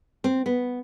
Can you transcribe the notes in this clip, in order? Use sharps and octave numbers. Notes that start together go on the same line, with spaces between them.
C4
B3